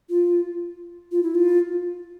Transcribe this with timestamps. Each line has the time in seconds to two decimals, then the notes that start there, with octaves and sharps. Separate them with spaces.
0.10 F4
1.12 F4
1.23 E4
1.35 F4